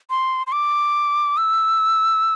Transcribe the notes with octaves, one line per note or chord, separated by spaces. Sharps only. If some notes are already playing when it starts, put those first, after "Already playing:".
C6
C6
D6
E6